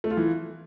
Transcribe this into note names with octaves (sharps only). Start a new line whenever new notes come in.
A3
F4
E3